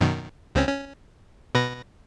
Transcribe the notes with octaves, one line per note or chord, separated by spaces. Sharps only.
F#2 B2 D#3
C#2 C4 C#4
C#4
B2 B4 A#6